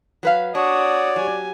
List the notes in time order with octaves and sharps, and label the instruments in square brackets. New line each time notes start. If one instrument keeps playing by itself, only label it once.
[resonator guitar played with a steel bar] F#3 B4 F5
[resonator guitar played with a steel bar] D4 [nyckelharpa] F#4 D#6 [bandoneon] C#5 [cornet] D5
[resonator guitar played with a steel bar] F#3 [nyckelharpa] G4 G#5